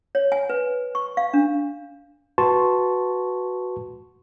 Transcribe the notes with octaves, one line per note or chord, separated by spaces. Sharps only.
C#5
G#5
B4
C#6
F5
D4
F#4 B4 A5 C6 C#6